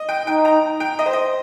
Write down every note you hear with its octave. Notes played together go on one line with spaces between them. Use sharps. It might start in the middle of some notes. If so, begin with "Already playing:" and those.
Already playing: D#5
G5
D#4 G5
A#5
G5
D#5
C5
D#5